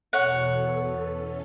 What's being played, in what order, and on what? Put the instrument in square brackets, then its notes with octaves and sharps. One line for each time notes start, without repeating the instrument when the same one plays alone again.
[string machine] E2 B2 B3 A4 [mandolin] C#5 F#5
[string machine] E3 C#4 A4